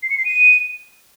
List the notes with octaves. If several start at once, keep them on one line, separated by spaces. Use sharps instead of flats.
C7
C#7
C7
D#7